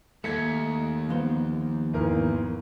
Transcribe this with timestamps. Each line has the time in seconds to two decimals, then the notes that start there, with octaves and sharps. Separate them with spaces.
0.24 D#2 A3 G#6 B6 C#7
1.09 F3 B3 C5
1.93 G#1 E2 A#4